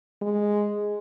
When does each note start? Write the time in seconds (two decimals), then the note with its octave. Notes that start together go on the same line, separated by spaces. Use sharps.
0.22 G#3